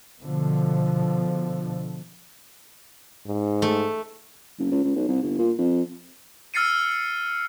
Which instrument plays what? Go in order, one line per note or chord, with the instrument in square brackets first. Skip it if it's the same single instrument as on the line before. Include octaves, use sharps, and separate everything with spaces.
[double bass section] B2 D3 F3
[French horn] G#2
[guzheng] A3
[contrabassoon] F#1
C#2
C#2
B1
C2
G1
A#2
F2
[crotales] E6 F6 A6 C7 C#7 D#7